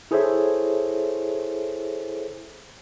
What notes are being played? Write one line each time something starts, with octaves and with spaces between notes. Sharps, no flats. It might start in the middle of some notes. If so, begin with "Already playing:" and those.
E4 G#4 A4 C5 C#5 E5